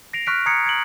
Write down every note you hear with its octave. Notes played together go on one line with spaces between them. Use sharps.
A#6 C7 D7 F7
C#6 F6 F#6 B6 D7
A#5 D#6 G#6 C7 C#7
G#6 C#7 D7 F#7